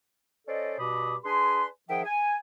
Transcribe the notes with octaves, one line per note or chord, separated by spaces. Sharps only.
C#4 A4 C5 D5 D#5
G2 B2 F#4 B5 D6 D#6
D4 G#4 B4 G#5 C6
D#3 F3 G#4 E5 F#5 G5
G#5